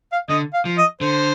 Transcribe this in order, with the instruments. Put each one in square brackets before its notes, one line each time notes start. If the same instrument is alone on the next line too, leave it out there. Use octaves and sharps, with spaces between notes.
[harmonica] F5
[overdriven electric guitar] D3 [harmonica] D#5
[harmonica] F5
[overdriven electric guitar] F3
[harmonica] D#5
[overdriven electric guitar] D3 [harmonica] C5